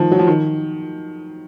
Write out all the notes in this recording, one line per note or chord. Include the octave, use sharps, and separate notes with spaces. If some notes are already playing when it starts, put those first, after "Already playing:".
Already playing: D#3 F3
F#3
F3
D#3